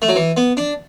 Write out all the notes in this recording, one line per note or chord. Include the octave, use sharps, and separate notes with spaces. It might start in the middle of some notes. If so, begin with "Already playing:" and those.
A3
F#3
E3
B3
D4